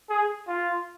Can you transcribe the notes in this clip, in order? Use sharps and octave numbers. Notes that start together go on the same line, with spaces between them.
G#4
F4